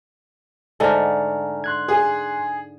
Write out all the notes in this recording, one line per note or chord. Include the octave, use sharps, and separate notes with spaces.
G#2 D3 A3 G#5 A#5 F6
C6 F#6 G#6
G#4